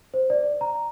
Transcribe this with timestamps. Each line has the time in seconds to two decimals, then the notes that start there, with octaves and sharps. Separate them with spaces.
0.14 C5
0.30 D5
0.61 A#5